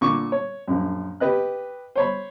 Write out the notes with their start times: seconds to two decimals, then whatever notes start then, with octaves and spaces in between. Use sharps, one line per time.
0.01 A#2 D3 C#6 D6
0.32 C#5
0.68 A#1 F#2
1.20 G4 B4 D#5 F#6
1.96 C5 C#5 B5